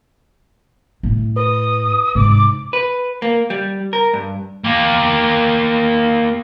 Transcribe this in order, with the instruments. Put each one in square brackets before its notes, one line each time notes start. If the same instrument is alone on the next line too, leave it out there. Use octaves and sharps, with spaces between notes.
[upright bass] A2
[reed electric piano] B4 [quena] D#6
[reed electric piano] G#2 C3 [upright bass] D#4 [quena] D6
[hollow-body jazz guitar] B4
A#3
G3
A#4
G2
[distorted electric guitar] A#3 G4